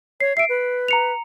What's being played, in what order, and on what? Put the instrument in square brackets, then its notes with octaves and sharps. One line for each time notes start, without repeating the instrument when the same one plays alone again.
[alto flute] C#5 [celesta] C7
[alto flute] E5 [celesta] C7 D7
[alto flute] B4
[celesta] A#5 C#7 F7